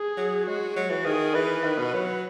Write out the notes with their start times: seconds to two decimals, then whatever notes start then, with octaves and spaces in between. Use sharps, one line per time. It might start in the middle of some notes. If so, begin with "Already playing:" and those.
Already playing: G#4
0.17 F#3
0.47 G#3 F#4
0.76 F#3 F#4
0.90 E3
1.05 D#3 G#4
1.35 E3 B4
1.64 D#3
1.78 B2
1.94 F#3